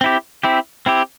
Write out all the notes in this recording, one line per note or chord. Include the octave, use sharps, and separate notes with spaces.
C4 E4 G4
C4 E4 G4
C4 E4 G4